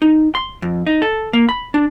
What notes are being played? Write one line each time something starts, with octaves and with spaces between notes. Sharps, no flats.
D#4
C6
F2
D#4
A4
A#3
B5
D4